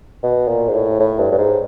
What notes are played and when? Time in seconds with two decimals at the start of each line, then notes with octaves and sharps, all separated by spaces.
0.23 B2
0.48 A#2
0.68 G#2
0.74 A2
1.00 A2
1.19 G2
1.31 G2
1.38 G#2